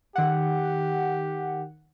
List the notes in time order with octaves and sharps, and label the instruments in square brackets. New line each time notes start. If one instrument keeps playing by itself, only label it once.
[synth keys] D#3 F#5 [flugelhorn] G4